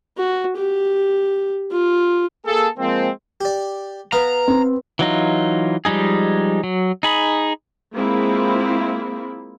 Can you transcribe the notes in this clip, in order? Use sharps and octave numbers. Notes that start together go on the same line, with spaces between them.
F#4
G4
F4
A#3 G#4 A4
F3 G#3 A#3 C4
G4 D5
B3 F5 A#5
C4
E3 F#3 D#4 F4
F3 G3 G#3 D#4 G#4
F#3
D#4 G#4 B5
G#3 A#3 C4 E4 F4